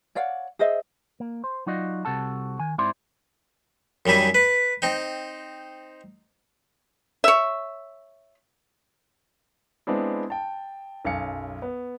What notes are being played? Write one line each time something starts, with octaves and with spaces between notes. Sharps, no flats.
C#5 D5 F5 F#5
G#4 C5 D#5 E5
A#3
C5
F#3 D#4 F4 F#4 D5 D#5
C2 C3 F#4 A4 A5
D#3 G#5
G#2 C4 E4 C5 D5 C6
F#2 D#3 G3 E4 G#5
B4
C4 D#4 G5
C#5 E5
G#3 B3 C4 D4 E4
G5 A5
B1 F#2 F5 G#5 C#7
B3